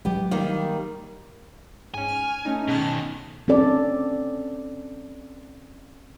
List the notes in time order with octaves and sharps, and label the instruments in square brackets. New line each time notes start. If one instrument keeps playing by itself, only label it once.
[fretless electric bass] F#3 G#3 [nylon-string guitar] B3 G4
[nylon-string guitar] D#3 G3 A#3
[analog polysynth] G#2 C#4 [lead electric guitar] G#5
[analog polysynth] F6
A3 C#4 D#4
[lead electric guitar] B2 D#3 [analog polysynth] G#4 A5 F6
[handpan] C4 C#4 A4 D5